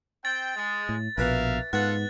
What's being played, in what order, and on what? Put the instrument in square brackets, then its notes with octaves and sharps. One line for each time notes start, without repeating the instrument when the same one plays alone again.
[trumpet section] C4 G5 [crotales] A6
[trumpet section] G#3
[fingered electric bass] A2
[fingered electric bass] A#1 B2 [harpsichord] E3 B4 [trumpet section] A#4 E5 F5
[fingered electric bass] G#2 [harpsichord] B3 [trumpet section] F4 A4 F#5 [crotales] F#6 A6